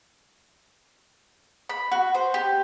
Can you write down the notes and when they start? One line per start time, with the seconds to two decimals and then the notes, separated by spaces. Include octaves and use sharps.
1.69 B5
1.92 F#4
2.14 C5
2.34 G4